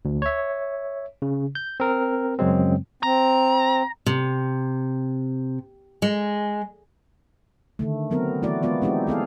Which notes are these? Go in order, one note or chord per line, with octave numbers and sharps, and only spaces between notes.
D2
C#5 E5
C#3
G6
C4 A#4
F#2 C#3 F#3 G#3 C4
C4 A#5
C3
G#3
D3 D#3 A3
F#3 B3 C4 A#4
E3 A3 E4 F#4 D5
G#3 B3 F4 D5
G#3 C4 D#4 E4 G4
B3 G#4 A4 F5